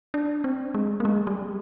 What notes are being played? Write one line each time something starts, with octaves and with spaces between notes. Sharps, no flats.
D4
C4
G#3
A#3
G#3
G3